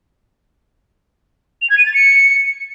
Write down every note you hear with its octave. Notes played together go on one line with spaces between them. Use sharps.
F7
G#6
D#7
A6
C#7